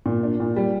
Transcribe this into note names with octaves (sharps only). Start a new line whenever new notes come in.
A#2
D4
A#2
G3